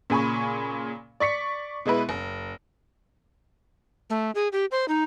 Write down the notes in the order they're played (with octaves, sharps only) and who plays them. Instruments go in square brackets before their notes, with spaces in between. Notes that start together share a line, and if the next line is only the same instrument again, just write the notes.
[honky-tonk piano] A#2 C#3 G#5 B5 C#6
D5 C#6 B6 C#7
B2 G#3 E4 B4
F#1
[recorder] A3
G#4
G4
C5
D#4